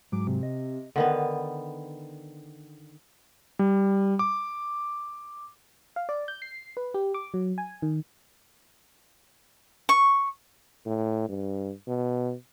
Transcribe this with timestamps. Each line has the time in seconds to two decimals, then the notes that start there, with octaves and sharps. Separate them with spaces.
0.12 G#2 F#3 D6
0.27 C3
0.43 D#5
0.96 D3 D#3 B3
3.59 G3
4.19 D6
5.96 F5
6.09 D5
6.28 G6
6.42 C7
6.77 B4
6.94 G4
7.14 D6
7.34 F#3
7.58 G#5
7.82 D#3
9.89 C#6
10.86 A2
11.29 G2
11.87 B2